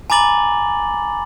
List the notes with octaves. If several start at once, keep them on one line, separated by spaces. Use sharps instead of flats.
G#5 A#5 B5 D6 A6 F#7